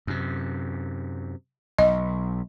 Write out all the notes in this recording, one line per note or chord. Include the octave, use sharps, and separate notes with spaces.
F#2 C3
B1 D#5